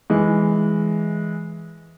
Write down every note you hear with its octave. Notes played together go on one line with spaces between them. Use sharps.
E3 G#3